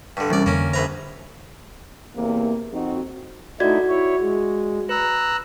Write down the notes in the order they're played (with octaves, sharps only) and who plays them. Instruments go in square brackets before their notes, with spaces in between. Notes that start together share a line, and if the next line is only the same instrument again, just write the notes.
[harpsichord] G2 D3 [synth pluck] C#6
[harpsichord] C2 D5 [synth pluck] E3 G3 C#4
[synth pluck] F2 D3 [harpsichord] A#3 C#4
[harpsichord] A#1 B4 A#5 [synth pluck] C5 E5 G#5
[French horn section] E2 C3 A#3
F2 C4 D#4 F#4
[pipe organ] A3 D#4 E4 [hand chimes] F#4 D5 G#6
[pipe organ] E4 C#5
G#3
[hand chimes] B4 [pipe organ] A#5 E6 F#6